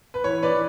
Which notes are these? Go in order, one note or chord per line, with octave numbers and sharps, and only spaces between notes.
B4
E3 C#5
B4 D5
E3